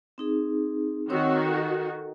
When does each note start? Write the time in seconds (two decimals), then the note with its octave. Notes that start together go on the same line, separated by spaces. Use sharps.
0.18 C4 D#4 G#4
1.10 D#3 C4 F#4 C#5 E6
1.42 A4